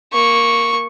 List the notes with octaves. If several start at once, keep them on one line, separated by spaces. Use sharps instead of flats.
A#3 C#6